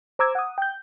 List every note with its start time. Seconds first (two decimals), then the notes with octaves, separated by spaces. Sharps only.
0.19 C5 A#5 D6 E6 G#6
0.35 F#5 D#6
0.58 G5 G6